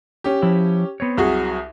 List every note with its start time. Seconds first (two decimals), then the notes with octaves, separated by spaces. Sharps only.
0.24 C#4 G4
0.42 F3 E4 E5
1.00 B3 C4 C#5
1.17 C2 F#3 F#4 G#4